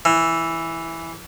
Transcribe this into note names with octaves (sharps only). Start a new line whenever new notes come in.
E3